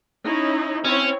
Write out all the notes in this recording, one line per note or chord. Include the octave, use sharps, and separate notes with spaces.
C#4 D#4 E4
C4 C#4 E4 C#5